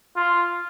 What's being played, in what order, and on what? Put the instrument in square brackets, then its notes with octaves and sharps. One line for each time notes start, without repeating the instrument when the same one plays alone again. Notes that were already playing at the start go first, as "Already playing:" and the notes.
[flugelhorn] F4